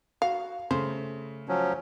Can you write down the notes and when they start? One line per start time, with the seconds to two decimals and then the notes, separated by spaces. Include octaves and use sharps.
0.22 F#4 F5
0.71 C#3 A3 C5
1.48 F3 F#3 C#4